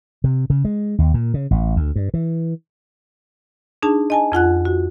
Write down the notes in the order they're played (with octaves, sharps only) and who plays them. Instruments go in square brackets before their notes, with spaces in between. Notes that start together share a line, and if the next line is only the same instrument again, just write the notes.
[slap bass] C3
C#3
G#3
D#2
A#2
C#3
A1
D2
G2
E3
[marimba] D4 D#4 G#4 A5
D#5 G#5 A5
F2 F4 F#5 F#6
F#4